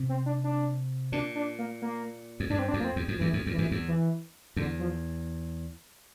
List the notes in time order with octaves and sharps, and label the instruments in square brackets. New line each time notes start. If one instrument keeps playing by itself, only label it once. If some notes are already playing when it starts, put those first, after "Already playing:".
Already playing: [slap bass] C3
[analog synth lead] C4
D4
D4
[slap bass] A#2 [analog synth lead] D4
[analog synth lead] D4
A#3
A#3
[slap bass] F2
[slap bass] G2 [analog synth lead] D4
[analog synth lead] C4
D4
[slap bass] F2
[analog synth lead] A#3
C4
[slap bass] E2
F2
[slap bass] E2 [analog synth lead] E3
[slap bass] F2
E2
[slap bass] F2 [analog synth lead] E3
[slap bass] E2
[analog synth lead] E3
[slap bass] E2 [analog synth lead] D3
[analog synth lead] F3